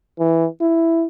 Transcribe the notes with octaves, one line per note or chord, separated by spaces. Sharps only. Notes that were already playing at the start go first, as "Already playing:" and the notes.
E3
E4